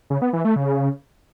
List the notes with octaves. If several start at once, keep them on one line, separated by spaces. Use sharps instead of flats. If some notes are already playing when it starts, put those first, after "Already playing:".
C#3
B3
E3
A3
C#3